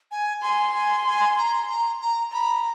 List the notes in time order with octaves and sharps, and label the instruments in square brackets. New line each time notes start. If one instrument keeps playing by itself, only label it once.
[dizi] G#5
[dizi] G#5 [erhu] C6
[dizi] G#5
G#5
A#5
A#5
A#5
[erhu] A#5 [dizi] B5